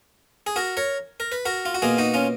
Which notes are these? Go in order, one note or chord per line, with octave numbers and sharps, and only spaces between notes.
G#4
F#4 A#4
A#4 C#5
A#4
B4
F#4 A#4
F4
F#4
B2 A#3 F4 G#4
D#4 F#4
C#4 F4